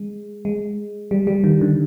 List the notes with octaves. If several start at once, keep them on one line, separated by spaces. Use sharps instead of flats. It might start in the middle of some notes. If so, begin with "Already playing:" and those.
Already playing: G#3
G#3
G3
G3
D#3
D3